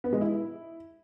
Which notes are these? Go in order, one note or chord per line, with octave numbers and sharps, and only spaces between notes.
B3
G#3
E4